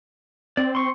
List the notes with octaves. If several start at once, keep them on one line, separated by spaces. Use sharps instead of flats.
C4 D5
C6 C#6